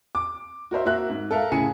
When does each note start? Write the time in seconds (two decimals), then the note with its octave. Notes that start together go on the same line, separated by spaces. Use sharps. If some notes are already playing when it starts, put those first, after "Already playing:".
0.15 D6
0.71 F#4 A#4 C5 E5
0.85 A#3 F#4 E5 F#6
1.10 G#2
1.31 A4 A#4 E5 F5
1.52 A2 C#3 G#4 G#5 C#7